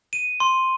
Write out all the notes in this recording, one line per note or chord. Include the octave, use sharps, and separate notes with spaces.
D#7
C6